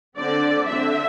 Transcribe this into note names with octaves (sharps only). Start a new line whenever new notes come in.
D3 C4 D5
D3 C4 E5